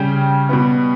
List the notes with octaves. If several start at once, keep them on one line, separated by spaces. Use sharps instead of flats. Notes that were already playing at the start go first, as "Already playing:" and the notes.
Already playing: C#3 G3 C#4 G5
B2 G3 B3